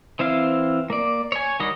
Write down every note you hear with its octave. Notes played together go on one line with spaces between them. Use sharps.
E3 C4 E4 F5
A#3 D5
C#5 G#5
D#3 G3 F#4 D#5